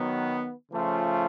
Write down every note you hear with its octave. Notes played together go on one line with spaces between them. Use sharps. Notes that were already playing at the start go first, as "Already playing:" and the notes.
Already playing: D#3 F#3 B3
C#3 F3 A3 C#4 F4